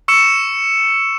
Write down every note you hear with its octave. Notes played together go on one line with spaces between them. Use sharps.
C#6 E6 C#7 E7